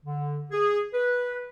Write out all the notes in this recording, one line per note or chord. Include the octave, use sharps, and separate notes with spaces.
D3
G#4
B4